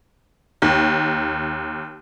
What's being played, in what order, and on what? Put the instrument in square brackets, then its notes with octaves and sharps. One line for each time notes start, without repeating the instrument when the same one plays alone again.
[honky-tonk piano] D#2